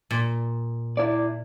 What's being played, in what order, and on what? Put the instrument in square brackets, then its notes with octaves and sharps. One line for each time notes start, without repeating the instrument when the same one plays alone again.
[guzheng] A#2
[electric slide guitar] E4 D5